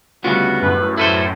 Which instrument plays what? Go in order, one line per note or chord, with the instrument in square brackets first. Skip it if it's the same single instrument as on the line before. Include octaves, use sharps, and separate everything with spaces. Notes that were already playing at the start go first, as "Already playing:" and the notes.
[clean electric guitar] D2 C#3 B3 [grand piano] G3 F4 [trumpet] F#4
[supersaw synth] F#2 A2 [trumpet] B4
[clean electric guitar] E4 B4 C5 [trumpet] A4